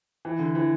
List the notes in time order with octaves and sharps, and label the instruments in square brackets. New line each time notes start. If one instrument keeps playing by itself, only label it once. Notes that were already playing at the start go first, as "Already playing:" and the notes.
[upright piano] E3
D3
E3